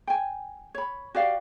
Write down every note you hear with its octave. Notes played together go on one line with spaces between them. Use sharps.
G5 G#5
C#5 B5
F#4 G4 D5 F5